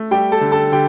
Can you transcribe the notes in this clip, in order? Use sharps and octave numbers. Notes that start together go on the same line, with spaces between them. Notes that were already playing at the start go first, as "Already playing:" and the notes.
Already playing: A3
G3 G4 G5
A4 A5
D3
A4 A5
D3 G4 G5